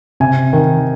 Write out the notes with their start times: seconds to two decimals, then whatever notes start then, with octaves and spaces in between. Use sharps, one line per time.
0.20 C3 G#5
0.53 D#3